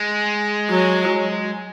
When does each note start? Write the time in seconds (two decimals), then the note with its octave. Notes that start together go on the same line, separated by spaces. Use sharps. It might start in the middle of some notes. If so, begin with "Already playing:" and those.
Already playing: G#3
0.70 F#3